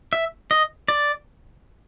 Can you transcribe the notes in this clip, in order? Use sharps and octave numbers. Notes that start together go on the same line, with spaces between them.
E5
D#5
D5